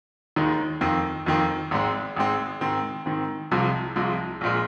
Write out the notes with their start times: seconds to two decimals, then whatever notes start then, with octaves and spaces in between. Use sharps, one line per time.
0.36 D#2 D#3 G#3 D#4
0.81 F2 D#3 C4
1.26 F2 D#3 C4
1.71 G#1 G#2 G#3 C4
2.16 G#1 G#2 G#3 C4
2.61 G#2 D#3 C4
3.06 G#2 D#3 C4
3.51 C2 C3 F3 G#3
3.96 C2 C3 F3 G#3
4.41 A#1 A#2 G#3